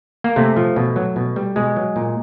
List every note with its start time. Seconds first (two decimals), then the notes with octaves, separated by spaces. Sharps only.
0.24 A#3
0.36 C3 A3
0.57 F3
0.76 B2
0.96 F#3
1.16 B2
1.36 G3
1.56 B2 G#3
1.77 F#3
1.96 A#2